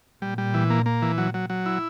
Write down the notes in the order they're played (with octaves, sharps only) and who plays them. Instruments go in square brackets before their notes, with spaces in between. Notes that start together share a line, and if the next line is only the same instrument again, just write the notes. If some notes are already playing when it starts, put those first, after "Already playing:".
[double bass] A#2 [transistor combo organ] G3
[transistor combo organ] G3
E3
A#3
A#3
E3
F#3
F#3
F#3
E4